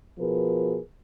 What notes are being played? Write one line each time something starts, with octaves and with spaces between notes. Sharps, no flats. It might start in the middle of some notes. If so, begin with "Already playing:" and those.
B2 F3 G#4 A#4 B4